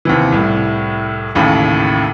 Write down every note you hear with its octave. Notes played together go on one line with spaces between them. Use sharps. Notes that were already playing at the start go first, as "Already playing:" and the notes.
D#2 C3 E3
C2 A2 C3
A1 D#2 A2 C#3